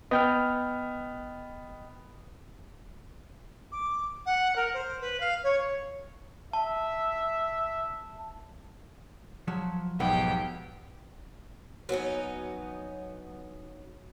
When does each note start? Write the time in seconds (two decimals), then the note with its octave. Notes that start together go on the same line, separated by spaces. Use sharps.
0.11 B3 D#5 G5 F6
3.72 D6
4.25 F#5
4.55 A#4
4.73 C5
5.00 B4
5.20 F5
5.43 C#5
6.53 E5 A5
9.48 F3 F#3 C#5
10.00 B1 G#2 B3 G4 G5
11.89 F#3 B3 C#4 D#4